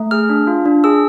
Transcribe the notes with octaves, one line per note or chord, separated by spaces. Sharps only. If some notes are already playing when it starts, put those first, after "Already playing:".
Already playing: A3
G#4 F6
D4
F4
D4
G#4 E6